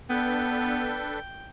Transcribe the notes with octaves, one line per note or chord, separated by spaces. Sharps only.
B3 D4 A4 B4 G5